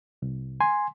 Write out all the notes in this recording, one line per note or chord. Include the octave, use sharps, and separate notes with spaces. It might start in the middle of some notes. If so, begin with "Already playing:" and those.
C2
G#5 C6